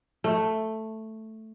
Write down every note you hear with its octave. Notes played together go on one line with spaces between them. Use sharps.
A3